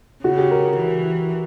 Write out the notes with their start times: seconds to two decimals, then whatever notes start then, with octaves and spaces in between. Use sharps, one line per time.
0.24 C#3 F#4
0.38 G4
0.51 A#4
0.77 E3